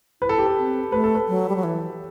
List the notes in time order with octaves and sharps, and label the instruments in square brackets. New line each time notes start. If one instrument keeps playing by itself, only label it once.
[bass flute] E4 [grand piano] B4
[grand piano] A4
G4
A4
[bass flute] C4
[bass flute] A3 [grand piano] B4
[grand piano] A4
B4
[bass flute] F#3
G3
F#3
E3